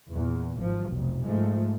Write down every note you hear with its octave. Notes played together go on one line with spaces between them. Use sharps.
E2 A#2
G#1 F3
F1 B1
G#2 F3 G#3 A3